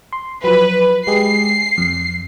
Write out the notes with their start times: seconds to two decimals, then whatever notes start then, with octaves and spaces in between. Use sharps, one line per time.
0.13 C6
0.44 F3 F#3 B4
1.07 G#3 G4 G#4 C7
1.78 F2